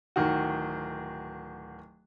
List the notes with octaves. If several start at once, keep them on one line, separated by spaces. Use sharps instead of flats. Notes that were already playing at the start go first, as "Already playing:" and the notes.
D1 D#3 F#4